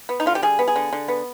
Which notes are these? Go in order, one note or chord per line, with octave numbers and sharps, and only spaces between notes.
B3
D#4
D3 F4
G4
G3 G#4
B3
G#4
D3
D3
B3